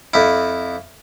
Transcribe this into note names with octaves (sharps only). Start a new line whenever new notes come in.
F2 E4